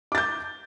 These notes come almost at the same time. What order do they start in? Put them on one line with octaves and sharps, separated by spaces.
D6 A6 G6